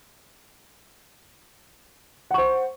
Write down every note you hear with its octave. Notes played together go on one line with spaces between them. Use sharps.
C5 F#5 C#6